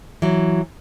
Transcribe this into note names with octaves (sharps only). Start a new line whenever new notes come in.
E3 F#3